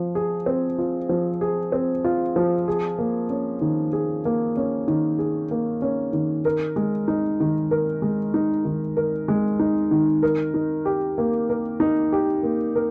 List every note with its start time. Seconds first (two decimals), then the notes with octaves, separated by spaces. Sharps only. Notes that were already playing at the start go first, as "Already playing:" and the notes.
Already playing: F3
0.15 G#4
0.46 C4
0.78 F4
1.09 F3
1.41 G#4
1.72 C4
2.04 F4
2.36 F3
2.68 G#4
2.99 A#3
3.30 C#4
3.61 D#3
3.93 G#4
4.25 A#3
4.57 C#4
4.88 D#3
5.19 G#4
5.51 A#3
5.82 C#4
6.13 D#3
6.45 A#4
6.76 G#3
7.08 D#4
7.40 D#3
7.71 A#4
8.02 G#3
8.34 D#4
8.65 D#3
8.97 A#4
9.28 G#3
9.60 D#4
9.91 D#3
10.23 A#4
10.54 D#4
10.85 G4
11.18 A#3
11.50 A#4
11.80 D#4
12.12 G4
12.43 A#3
12.75 A#4